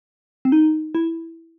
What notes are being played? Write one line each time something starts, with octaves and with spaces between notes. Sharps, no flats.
C4
D#4
E4